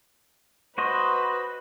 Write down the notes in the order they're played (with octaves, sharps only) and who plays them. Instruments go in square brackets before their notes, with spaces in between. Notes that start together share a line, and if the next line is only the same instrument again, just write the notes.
[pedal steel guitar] F#4 C5 D#5 [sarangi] B4